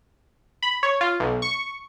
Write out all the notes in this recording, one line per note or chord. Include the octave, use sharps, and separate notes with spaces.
B5
C#5
F4
B1
C#6